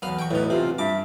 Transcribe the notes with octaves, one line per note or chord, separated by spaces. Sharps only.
B1 E2 B3 F5
G5 C#6
A2 D#4 B4
C3 F4
G2 E5 D6